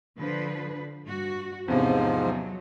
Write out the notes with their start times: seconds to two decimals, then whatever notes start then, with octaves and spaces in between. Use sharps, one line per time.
0.18 D3 F3 B4
1.05 G2 F#4
1.68 E2 G#2 C3 F3 C#4
2.19 F#3